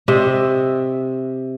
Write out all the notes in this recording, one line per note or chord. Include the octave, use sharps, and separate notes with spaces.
C3 D#5 E5